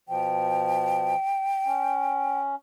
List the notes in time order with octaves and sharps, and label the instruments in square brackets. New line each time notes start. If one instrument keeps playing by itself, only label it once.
[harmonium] B2 F3 [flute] G5
[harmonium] C#4